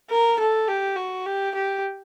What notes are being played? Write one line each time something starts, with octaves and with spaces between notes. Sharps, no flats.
A#4
A4
G4
F#4
G4
G4